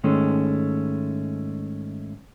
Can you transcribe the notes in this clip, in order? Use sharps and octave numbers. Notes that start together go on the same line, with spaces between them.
G#2 D#3 G#3 A3 C#4